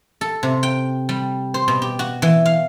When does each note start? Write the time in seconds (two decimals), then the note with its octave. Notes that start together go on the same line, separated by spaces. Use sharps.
0.21 A4
0.43 C3
0.63 G5
1.09 G3
1.54 C5
1.68 B2
1.82 G4
1.99 F#4
2.22 E3
2.46 F5